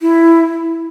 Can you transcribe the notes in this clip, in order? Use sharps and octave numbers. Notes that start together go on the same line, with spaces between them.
E4